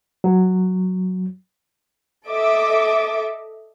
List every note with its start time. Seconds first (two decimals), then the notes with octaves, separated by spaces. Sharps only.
0.24 F#3
2.26 A4 D#5 E5 D6